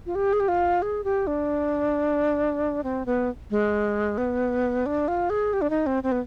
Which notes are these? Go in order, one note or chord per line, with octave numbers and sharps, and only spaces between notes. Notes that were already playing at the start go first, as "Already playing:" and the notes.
F4
G4
G#4
G4
F4
G#4
G4
D4
C4
B3
G#3
B3
D4
F4
G#4
G4
D4
D#4
C4
C4
B3